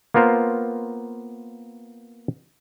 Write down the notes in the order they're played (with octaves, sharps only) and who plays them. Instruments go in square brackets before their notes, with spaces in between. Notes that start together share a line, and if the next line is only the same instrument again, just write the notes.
[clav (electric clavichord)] A#3 B3 F4 A#4 C5